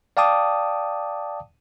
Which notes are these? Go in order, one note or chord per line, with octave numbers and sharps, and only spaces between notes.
D5 F5 G5 A5 D6 D#6